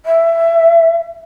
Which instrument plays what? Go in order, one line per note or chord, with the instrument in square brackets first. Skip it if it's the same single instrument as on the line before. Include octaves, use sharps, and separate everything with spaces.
[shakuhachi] E5